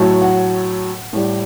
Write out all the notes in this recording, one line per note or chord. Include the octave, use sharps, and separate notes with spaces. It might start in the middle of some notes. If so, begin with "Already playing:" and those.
Already playing: A2 F#3 A3
F#5
A2 G3